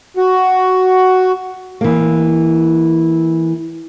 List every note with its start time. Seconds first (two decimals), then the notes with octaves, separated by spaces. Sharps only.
0.17 F#4
1.81 E3 A#3